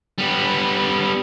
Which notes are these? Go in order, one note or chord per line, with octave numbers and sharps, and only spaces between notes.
G3 B3